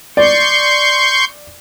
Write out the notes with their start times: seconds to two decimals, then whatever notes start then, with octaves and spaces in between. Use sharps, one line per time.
0.17 D5 C6 C#6 G6